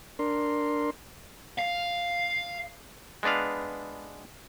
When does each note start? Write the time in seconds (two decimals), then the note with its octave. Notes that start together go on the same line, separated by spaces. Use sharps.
0.19 D4 A#4 C6
1.59 F5
3.23 G#3 B3 D4 B4 F5